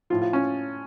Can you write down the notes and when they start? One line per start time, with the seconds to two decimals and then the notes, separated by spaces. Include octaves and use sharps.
0.10 A2 F3 F4
0.22 F4
0.33 C#4